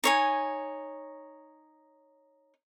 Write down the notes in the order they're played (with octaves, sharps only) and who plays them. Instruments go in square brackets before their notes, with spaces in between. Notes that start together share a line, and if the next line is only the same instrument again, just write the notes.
[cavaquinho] D#4 C#5 G#5